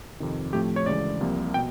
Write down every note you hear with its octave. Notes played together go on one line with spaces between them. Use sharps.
F2 C3 D#3
A2 F3 A3 C4 G4
C#5
D2 C#3 E3 G#3 D5
C2 C3 F3 A#3
B2 G5